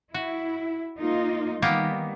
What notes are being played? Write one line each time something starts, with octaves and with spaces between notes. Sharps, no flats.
E4 F#4
A#3 D#4 F4
D#3 G3 A#3 B3 G4